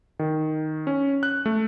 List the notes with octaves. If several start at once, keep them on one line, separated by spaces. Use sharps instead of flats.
D#3
C#4
F#6
A3